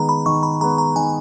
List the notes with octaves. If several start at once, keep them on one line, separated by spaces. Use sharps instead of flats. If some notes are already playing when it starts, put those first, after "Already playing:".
Already playing: D#3 G#3 B3 A#5
B5
D#3 C#6
B5
G#3 B3 A#5
A#5
D#3 G#5